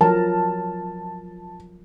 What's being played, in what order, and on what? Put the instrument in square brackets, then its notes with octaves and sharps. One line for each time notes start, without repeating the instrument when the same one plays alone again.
[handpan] F3 F#3 A#4 [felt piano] A5